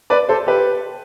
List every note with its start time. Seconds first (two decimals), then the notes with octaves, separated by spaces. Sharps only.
0.10 B4 D5
0.29 A4 C5
0.47 G4 B4